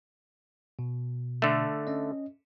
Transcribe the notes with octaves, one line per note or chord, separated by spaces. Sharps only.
B2
D3 A3
C#4 D#5